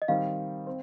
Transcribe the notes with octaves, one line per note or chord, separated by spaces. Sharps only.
D#5
D#3 G3 C4 F5
C4